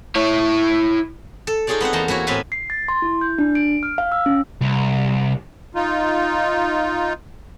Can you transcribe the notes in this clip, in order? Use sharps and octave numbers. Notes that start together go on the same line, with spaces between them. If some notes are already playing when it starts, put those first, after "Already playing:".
E4 C#5
A4
D#4 F4 G#4 A4 C#5 D5
B3 C4 C5 F#5
E2 A#3 A5 A#5 C6
A#3 E4 F#4 C#5
A2 C4 A4 B4 F5 G#5
C7
A6
C6
E4
G6
D4
D7
F6
F5
E6
C#4
C2
D#4 F4